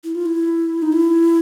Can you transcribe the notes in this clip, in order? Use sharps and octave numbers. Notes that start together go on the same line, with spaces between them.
E4
F4
E4
D#4
E4